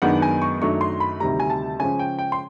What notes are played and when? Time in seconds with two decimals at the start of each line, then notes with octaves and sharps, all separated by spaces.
0.02 F#2 D#3 G#3 B3 D4 F#5
0.22 G#5
0.42 C#6
0.61 F#2 D#3 F#3 A3 D4 C#6
0.81 C6
1.00 B5
1.20 D2 C3 D#3 G3 A#5
1.40 G#5
1.50 A5
1.80 C#3 F3 G#3 C#4 G#5
1.99 G5
2.19 G5
2.32 C6